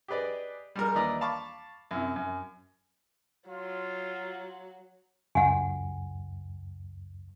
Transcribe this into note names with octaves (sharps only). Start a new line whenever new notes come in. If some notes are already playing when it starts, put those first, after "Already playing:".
G4 G#4 B4 D5 D#5
G3 G#3 A#4
D#2 E3 B4 D5 D#5 A#5
F5 A5 B5 C#6 D6
F#2 C3 E4
F#2
F#3 F4
C#2 F#2 F#5 G#5